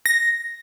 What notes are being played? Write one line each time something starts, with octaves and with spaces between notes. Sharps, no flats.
A#6